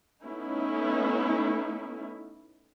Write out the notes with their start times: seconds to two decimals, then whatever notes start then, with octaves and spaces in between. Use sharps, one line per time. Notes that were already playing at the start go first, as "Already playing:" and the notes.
0.22 A3 B3 C#4 D#4 E4